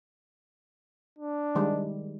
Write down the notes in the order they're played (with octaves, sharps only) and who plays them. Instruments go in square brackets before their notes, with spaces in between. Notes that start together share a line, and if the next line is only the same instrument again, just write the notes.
[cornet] D4
[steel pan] D#3 G3 G#3